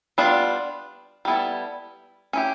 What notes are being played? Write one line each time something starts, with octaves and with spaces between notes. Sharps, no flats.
G3 B3 D4 F4
G3 B3 E4 A4
C#4 E4 G4